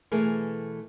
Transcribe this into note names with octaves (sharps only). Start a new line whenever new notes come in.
B2 E3 A3 G#4 A#4 B4